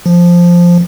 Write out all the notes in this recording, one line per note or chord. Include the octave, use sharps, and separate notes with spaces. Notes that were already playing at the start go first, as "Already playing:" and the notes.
F3